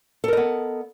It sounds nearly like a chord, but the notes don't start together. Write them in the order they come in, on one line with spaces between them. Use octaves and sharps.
A4 A#4 D#5 B3